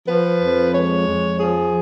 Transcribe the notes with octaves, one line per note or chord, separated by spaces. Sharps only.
F3 B4
F2
G#3 C#5
F2
F3 G#4